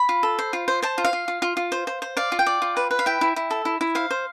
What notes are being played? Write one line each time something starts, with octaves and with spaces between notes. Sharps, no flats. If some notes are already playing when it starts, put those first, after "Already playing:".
Already playing: B5
F4
A4
C5
F4
C5
C5 A5
F4
F5
F4
F4
F4
F4
C5
C5
C5
D5 F5
F4
G5
D5
F4
B4
B4
F5
E4 G5
E4
E4
A4
E4
E4
C5 F5
C5